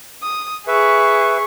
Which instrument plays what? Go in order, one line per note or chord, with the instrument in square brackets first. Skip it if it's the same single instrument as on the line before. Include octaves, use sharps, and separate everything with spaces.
[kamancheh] D#6
[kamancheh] G#4 C#6 [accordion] B4 E5